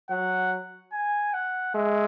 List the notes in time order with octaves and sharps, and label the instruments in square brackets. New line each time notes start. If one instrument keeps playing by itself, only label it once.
[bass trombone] F#3 [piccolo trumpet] F#5
[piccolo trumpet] G#5
F#5
[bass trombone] G#3 [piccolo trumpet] E5